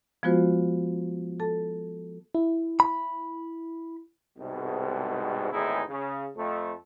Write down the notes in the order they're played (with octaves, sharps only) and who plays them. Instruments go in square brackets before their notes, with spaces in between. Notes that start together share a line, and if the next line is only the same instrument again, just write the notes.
[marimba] F3 G#3 B3 F4 F#4 C5
A4 A5
[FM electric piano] E4
[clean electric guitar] B5
[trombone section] C2 G#2 B2
G#1 E2 A2 D#4 E4 G#4
C#3
F2 A3